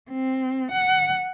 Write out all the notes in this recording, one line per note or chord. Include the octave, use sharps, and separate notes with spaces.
C4
F#5